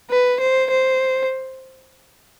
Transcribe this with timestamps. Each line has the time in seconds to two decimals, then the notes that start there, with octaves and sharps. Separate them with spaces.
0.10 B4
0.40 C5
0.71 C5